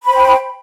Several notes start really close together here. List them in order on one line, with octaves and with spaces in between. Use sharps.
B5 C5 G5